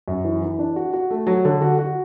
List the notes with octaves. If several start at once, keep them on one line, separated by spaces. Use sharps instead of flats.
F#2
E3
E3
D4
F#4
F#4
A3
F#3
D3
F#4
F#4